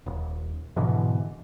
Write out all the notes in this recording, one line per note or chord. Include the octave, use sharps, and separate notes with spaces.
D#1
G#2 B2 D3 E3